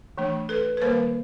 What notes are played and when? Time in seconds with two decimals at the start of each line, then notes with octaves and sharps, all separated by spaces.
0.18 E3 A3 D4
0.49 A4 B4
0.77 B4
0.82 D#3 G3 A#3 A#4 C5